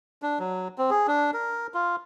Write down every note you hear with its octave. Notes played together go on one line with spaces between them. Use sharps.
D4
F#3
C4
G#4
D4
A#4
F4